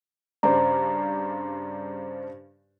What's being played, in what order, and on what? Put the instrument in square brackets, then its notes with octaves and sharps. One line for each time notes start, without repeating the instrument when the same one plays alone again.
[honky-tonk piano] G2 C#3 D4 [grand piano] C5 D5 [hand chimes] A#5